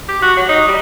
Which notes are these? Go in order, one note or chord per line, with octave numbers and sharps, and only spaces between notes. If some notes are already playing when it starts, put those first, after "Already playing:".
G4
F#4
F#3
D#4
G3